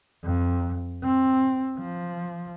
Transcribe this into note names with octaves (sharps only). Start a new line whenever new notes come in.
F2
C4
F3